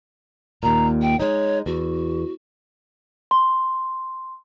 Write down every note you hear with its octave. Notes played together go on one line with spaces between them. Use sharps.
D#2 A#2 A#5
G5
G#3 D#4 C#5
E2 F#4
C6